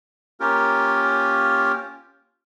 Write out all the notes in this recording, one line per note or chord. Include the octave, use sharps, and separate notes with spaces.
A#3 C#4 F4 G4 A#4